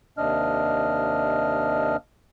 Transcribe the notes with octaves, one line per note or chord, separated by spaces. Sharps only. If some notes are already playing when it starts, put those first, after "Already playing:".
D#2 C3 D4 D#5 F6